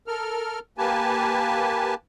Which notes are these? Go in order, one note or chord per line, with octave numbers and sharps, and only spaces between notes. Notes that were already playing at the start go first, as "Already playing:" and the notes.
A4 A#4 F6
A#3 G4 B4 G#5 A5